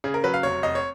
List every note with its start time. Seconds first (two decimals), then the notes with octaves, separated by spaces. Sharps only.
0.04 C#3 G#4
0.14 A#4
0.24 F#3 B4
0.34 F5
0.43 F1 C#5
0.63 F1 D#5
0.75 C#5